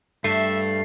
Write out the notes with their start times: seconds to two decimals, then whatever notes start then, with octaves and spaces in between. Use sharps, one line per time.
0.24 G2 A3 E5 C7